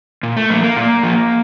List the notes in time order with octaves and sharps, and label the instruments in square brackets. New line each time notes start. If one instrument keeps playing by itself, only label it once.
[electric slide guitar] A#2
A3
F3 A#3
A#3
A#2
F3